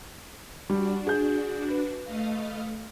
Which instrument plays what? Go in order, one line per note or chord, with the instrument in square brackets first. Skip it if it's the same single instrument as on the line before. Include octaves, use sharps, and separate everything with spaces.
[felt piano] G3 [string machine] D4 F#4
[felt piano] G#4 G6
B4
[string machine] A3 D#5 F5